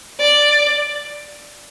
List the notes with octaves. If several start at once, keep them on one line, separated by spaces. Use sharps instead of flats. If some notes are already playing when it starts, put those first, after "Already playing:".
D5